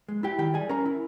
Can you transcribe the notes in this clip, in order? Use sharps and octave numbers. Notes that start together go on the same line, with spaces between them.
G#3
E4 G4 G5
D#3 G4 G5
G3 G#4 G#5
C#4 A#4 A#5
E4